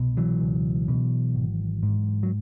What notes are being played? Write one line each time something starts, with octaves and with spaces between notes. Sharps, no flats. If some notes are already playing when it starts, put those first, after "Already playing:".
Already playing: C2 B2
E3 F#3
C#2
B2
G#1
G#2
F#3